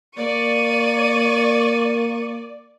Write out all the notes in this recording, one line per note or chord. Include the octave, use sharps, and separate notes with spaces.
A#3 D5 C#6 D#7